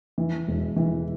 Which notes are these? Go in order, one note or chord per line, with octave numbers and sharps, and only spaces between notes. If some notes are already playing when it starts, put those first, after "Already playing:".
E3
E1
E3